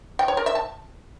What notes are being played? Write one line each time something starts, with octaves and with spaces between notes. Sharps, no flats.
G5
C#5
A#4
E5
A5